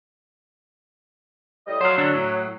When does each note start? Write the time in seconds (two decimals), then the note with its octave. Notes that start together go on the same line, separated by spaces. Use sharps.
1.68 A2 G3 D#5
1.81 F#3 C5 F5
1.98 D3 D4 A4
2.14 A2